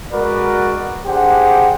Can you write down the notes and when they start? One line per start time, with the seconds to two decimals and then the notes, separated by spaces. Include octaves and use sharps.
0.13 G#3 F#4 A#4 B4 D5
1.06 D4 G4 G#4 C5 D5 F#5